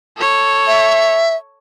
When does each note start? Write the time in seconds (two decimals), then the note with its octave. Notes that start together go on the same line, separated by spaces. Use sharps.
0.17 A4 C#5
0.67 E5